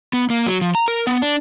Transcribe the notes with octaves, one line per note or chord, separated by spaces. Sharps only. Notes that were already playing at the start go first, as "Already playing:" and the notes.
B3
A#3
F#3
F3
A#5
A#4
B3
D4